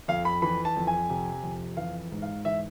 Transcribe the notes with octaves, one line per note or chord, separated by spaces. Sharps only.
F2 F5
B5
E3 B5
A5
F2
G#5
C3
F2
E3 F5
G#2
F5
E3 E5